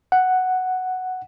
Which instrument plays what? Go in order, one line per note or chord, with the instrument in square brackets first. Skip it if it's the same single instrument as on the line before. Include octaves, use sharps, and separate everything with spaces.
[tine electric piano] F#5